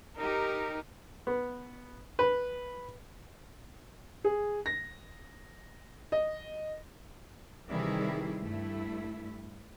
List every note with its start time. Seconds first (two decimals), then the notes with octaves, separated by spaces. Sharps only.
0.17 D#4 G4 A#4
1.27 B3
2.19 B4
4.24 G#4
4.66 A#6
6.12 D#5
7.69 C3 D#3 E3 G3 E4 G#4
8.41 G2 A3 E4